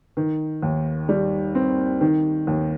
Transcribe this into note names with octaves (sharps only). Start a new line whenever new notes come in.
D#3
D#2
G3
C4
D#3
D#2